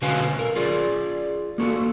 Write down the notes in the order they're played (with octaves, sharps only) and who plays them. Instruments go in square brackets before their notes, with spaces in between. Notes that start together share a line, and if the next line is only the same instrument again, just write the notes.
[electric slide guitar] B2 D3 F#4 B4 F5 G#5
A#4
F4 G#4 D5
A#3 F#4 A4